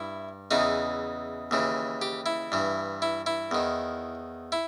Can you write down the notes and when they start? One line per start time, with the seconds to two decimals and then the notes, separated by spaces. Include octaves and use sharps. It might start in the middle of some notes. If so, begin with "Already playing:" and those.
Already playing: G2 E4
0.51 E2 C#3 E3 D#4
1.51 D#2 C#3 E3
2.02 G4
2.26 E4
2.52 G2 E3
3.02 E4
3.26 E4
3.51 E2 D#3
4.52 E4